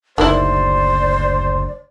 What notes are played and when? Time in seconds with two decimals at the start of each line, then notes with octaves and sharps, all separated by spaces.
0.18 F#1 D2 D#3 B3 E4 C5 D5